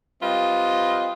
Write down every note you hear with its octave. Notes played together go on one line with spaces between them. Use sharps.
G3 C4 F4 B4 D#5